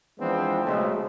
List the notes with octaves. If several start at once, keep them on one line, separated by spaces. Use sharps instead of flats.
E3 F3 G#3 B3 C4 D4
B1 C#3 F#3 G#3 A3 C5